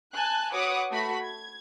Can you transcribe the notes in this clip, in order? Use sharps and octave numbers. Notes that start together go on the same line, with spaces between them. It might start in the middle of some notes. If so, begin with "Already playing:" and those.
G#5 A5 F#6
F#4 B4 C#5 F#5 D6 D#6
A3 F#4 B5
G#6